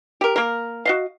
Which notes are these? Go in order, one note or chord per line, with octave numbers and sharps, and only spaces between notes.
G4 A#4
A#3 A#4
F#4 D#5 F5